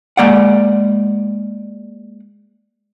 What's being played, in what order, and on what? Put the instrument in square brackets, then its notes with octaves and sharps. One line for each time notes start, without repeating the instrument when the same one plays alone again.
[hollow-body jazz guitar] G#3 A#3 D5 F#5